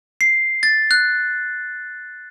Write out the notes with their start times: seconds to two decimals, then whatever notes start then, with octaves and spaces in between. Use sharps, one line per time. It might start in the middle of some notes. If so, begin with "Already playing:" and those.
0.21 C7
0.63 A6
0.91 F#6